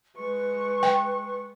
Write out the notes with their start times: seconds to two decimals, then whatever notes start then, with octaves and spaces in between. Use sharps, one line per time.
0.16 G#3 B4 C#6
0.83 G5